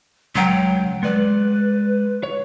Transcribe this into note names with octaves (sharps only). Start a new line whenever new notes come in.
C#2 F#3 F#5 G5
G#3 B4 D5
C#5